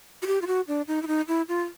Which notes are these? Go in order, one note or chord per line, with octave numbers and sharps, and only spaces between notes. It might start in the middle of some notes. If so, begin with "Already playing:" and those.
F#4
G4
F4
F#4
D4
D#4
E4
D#4
E4
F4